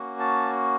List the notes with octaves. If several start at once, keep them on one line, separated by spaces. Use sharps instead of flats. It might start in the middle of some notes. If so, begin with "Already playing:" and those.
Already playing: A#3 C#4 F#4
A5